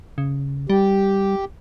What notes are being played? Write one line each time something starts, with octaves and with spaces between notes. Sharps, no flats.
C#3
G3 G4